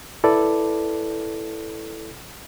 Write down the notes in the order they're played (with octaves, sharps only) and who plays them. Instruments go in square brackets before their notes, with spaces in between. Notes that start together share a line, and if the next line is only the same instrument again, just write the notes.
[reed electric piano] E4 A4 B4 D5